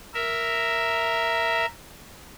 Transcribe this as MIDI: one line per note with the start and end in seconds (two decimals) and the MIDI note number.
0.14 1.66 70
0.14 1.66 76